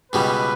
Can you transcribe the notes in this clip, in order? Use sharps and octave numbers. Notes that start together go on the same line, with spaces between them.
C#2 B2 G3 B4